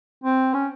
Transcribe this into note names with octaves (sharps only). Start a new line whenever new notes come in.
C4
C#4